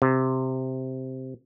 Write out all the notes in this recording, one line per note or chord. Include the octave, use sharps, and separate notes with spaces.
C3